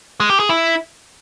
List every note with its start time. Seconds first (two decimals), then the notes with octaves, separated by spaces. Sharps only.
0.20 G#3
0.30 G4
0.40 G#4
0.49 E4